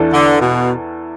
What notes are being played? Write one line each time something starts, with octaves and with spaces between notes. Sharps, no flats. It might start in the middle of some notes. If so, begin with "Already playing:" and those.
Already playing: E2 E3 D4 A4
D3
B2